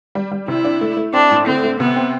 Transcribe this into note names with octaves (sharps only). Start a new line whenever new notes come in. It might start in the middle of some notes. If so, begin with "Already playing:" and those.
G3
G3
C3 E4
D4
A3
A3
C4 D4
A2
D3 C4
A3
C3 B3
C4